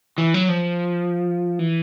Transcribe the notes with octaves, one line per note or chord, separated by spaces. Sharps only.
E3
F#3
F3
E3